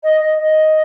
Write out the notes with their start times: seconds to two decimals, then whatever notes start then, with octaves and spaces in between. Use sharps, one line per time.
0.03 D#5
0.21 D#5
0.38 D#5